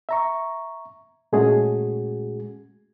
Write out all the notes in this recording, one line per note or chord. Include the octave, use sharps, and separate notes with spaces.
E5 A#5 C#6
A#2 G#3 A3 C#4 F#4 G#4